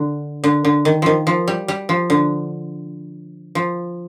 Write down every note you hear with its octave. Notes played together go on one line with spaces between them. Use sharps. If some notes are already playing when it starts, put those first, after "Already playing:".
Already playing: D3
D3
D3
D#3
D#3 F3
F3
G3
G3
F3
D3
F3